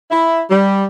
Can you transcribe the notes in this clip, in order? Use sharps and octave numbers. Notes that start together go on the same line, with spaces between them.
E4
G3